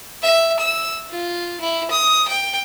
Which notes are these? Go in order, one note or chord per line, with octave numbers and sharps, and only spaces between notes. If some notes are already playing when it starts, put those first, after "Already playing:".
E5
E6
F4
E4
D#6
G5